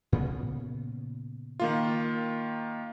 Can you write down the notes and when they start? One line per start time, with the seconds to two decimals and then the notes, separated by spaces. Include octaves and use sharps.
0.12 A#2 C#3 B3
1.60 D#3 A#3 F4